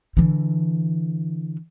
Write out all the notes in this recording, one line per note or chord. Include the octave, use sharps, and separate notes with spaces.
D3 E3